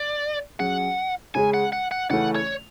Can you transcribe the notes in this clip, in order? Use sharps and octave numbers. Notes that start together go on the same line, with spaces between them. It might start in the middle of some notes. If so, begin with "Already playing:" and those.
Already playing: D5
F#3 C#4 G#4 F#5
C#3 G#3 C#4 G#4 G#5
F#5
F#5
F#5
C#3 E3 A3 C#4 F#5
C#5